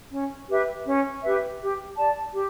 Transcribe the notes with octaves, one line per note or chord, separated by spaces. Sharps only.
C#4
G4 B4 E5
C#4
G4 B4 E5
G4
D5 A5
G4